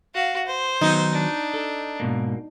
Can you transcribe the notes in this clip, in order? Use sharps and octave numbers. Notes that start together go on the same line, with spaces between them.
F#4 F5
C5
D#3 F#3 B3 D#4
D4
A4
G#2 B2 A#3